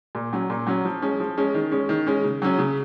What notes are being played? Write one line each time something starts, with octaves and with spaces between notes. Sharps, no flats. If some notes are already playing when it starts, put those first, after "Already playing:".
A#2
F#3 C#4
A#2
F#3 C#4
F3
G#3 C#4
F3
G#3 C#4
D#3
G#3 C#4
D#3
G#3 C#4
C#3
F#3 C#4
C#3